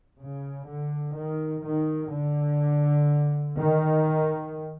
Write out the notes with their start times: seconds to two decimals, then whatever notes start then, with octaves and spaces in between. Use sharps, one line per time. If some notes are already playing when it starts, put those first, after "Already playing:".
0.20 C#3
0.68 D3
1.17 D#3
1.65 D#3
2.13 D3
3.57 D#3